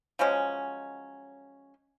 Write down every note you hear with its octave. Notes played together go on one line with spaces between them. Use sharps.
F3 F#3 G#3 C#4